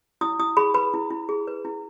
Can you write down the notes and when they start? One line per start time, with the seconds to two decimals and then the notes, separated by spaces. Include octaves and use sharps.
0.21 E4 D#6
0.39 E4 D#6
0.57 G#4 B5
0.74 B4 B5
0.94 E4
1.10 E4
1.29 G#4
1.47 B4
1.65 E4